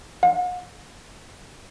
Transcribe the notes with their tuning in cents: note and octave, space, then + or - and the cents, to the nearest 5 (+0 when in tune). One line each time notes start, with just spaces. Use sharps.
F#5 -45